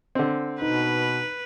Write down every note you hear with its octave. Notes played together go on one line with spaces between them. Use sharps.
D3 C4
B2 D#4 B4